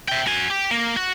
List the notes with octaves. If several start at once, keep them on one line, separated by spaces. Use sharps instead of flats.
E5 G5
F#4 G#5
G4
A#3
F#4